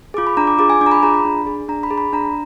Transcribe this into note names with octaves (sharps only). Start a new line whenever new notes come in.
F4 G#4 D6
B5
D4 A#5
D6
F4 G#4 D6
G#5
D4 D6
A#5
B5
F4 G#4 A#5
B5
D4
G#4
D4 A#5
B5
G#4
B5
D4 A#5